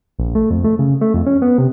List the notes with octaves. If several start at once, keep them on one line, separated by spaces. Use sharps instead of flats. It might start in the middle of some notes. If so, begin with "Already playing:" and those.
A#1
A3
F2
A3
C#3
A3
F2
C#4
B3
C3